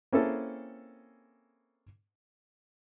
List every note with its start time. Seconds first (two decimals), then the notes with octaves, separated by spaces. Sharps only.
0.13 A#3 C4 C#4 E4 G#4 A4